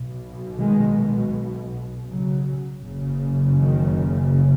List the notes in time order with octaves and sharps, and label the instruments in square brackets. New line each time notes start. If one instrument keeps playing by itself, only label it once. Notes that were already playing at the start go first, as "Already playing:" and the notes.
Already playing: [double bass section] B1 B2
D#3 G#3
C#3 F#3
F#1 F#2 C#3
D#3